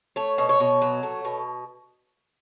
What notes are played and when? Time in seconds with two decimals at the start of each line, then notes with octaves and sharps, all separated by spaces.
0.16 A3 C#5
0.38 B2
0.49 C#5
0.60 B2
0.82 F#3
1.03 A3
1.25 B2